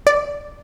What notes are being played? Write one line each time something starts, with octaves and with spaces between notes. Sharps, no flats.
D5